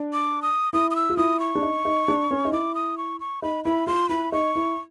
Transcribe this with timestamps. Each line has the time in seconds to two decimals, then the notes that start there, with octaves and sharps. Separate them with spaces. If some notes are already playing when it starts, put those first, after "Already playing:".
Already playing: D4
0.13 D6
0.42 D#6
0.73 E4 D#6
0.91 D#6
0.96 E6
1.10 F4
1.17 E4 D#6
1.40 C#6
1.55 D4
1.62 D#4
1.85 D#4
2.08 D4
2.31 C#4
2.45 D#4
2.52 E4 D6
2.75 D#6
2.98 C#6
3.20 C#6
3.42 D#4 B5
3.65 E4 B5
3.87 F4 C6
4.09 E4 B5
4.32 D#4 C#6
4.56 E4